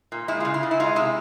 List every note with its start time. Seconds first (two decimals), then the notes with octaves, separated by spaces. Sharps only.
0.12 A#2
0.28 G#3 E4
0.40 C#3 F4
0.54 E4
0.63 C#3
0.71 E4
0.80 G#3 F4
0.96 C3 E4